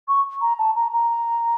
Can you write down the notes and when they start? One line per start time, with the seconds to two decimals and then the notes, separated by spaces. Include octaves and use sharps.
0.08 C#6
0.41 A#5
0.59 A5
0.76 A#5
0.93 A#5